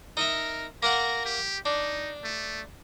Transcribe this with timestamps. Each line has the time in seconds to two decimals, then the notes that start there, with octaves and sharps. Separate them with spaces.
0.17 D#4 A#4 D#5 E5
0.83 A#3 A#4 F#5 A#5
1.25 G4
1.66 D4 D#4
2.24 A3